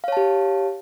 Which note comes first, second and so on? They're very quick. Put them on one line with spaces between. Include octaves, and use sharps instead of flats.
F5 C#5 A5 G4